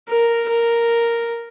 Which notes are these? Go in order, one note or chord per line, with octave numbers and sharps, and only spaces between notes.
A#4
A#4